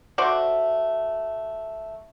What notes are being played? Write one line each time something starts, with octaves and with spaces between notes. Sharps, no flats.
A3 F#4 C5 D5